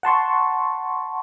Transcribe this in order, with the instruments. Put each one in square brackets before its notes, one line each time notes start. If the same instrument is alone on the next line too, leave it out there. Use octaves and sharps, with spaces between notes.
[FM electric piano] F#5 A5 C6 C#6